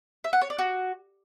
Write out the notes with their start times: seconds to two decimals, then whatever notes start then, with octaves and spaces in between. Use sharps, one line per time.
0.24 E5
0.33 F#5
0.41 C#5
0.50 D5
0.59 F#4